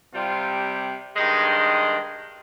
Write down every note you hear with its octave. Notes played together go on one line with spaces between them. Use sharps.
C3 G3 F4
G2 D#3 G#3 D#4